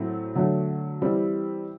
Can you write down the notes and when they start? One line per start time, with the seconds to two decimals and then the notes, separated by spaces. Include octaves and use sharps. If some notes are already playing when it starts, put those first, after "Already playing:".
Already playing: A2 F#3 A3 C4
0.35 D3 F#3 A3
1.02 E3 G3 C4